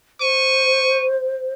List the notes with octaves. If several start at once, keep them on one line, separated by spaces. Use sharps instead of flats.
C5 C#6 D#7